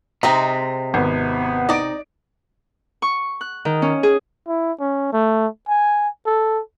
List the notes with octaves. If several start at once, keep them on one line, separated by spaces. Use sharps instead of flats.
C3 G#3 C4 D#4 A#5
G#1 B3
D#4 D5 D#5 D7
C#6
F#6
D#3
C#4
G#4
E4
C#4
A3
G#5
A4